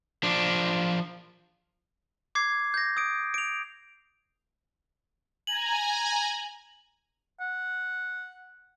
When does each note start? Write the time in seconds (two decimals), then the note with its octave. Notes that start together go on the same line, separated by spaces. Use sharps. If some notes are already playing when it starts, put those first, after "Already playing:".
0.23 F3 D4
2.35 D6 G#6 C7
2.74 G6 A#6
2.97 D#6 D7
3.34 D7 F7
5.47 G#5 A#5 F#7
7.41 F#5